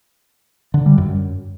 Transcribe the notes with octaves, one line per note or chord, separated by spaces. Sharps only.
D3
G3
F#2